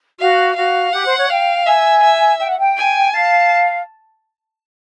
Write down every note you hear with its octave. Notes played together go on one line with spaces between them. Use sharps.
F#4 F5
F#4 F5
G4 F#5
C5
C#5
F5 G5
E5 G#5
E5
G5
F#5
G5
G#5
F5 A5